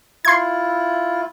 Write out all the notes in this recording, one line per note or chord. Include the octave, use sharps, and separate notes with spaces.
E4 F4 C6 G#6